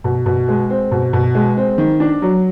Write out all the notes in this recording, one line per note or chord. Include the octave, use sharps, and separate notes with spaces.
B2
B2
G#3
C4
B2
B2
G#3
C4
D#3
D4
F#3